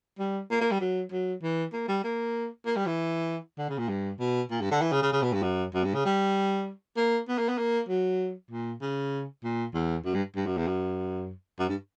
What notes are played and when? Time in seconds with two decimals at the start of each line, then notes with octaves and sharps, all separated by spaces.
0.19 G3
0.51 A#3
0.61 A#3
0.71 G3
0.80 F#3
1.12 F#3
1.42 E3
1.73 A#3
1.88 G3
2.04 A#3
2.66 A#3
2.76 G3
2.86 E3
3.58 D3
3.69 C#3
3.78 A#2
3.89 G2
4.20 B2
4.51 A#2
4.61 G2
4.71 D3
4.81 E3
4.92 C#3
5.02 C#3
5.12 C#3
5.22 B2
5.33 G2
5.42 F#2
5.74 F#2
5.84 G2
5.94 C#3
6.05 G3
6.97 A#3
7.28 B3
7.38 A#3
7.48 B3
7.58 A#3
7.89 F#3
8.51 A#2
8.81 C#3
9.43 A#2
9.74 E2
10.05 F#2
10.15 G2
10.36 G2
10.46 F#2
10.57 E2
10.67 F#2
11.59 F#2
11.69 G2